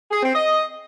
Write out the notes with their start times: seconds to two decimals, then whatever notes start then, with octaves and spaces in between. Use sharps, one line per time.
0.11 G#4
0.23 C4
0.35 D#5